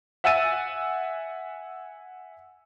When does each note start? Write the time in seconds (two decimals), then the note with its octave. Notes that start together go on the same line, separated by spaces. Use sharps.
0.24 E5 F#5 G#5 E6 A6 D#7